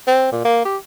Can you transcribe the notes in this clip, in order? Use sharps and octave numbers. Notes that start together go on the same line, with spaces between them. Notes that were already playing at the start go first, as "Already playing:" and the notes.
C4
A#2
A#3
G4